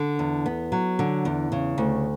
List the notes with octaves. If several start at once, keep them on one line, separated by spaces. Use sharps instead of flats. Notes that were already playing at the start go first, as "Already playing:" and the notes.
Already playing: D3
E2
B3
F#3
D3
E2
C#3
D2